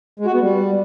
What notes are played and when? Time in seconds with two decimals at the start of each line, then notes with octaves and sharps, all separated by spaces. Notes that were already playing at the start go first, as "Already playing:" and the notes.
0.19 G#3
0.26 F#4
0.33 B3
0.40 G3